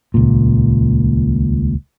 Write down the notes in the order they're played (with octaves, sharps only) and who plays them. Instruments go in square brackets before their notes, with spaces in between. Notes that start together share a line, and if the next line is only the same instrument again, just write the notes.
[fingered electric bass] D#1 C#2 A#2